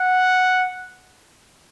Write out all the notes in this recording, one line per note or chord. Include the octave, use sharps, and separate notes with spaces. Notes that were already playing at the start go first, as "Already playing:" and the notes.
Already playing: F#5